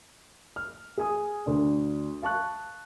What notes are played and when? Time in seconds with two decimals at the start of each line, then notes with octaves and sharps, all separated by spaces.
0.56 F6
0.98 G#4 G#5 D#6
1.46 D2 D4
2.22 F5 A5 C#6 F#6